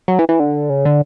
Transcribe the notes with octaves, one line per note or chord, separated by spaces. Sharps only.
F#3
E3
E3
D3
C#3
D3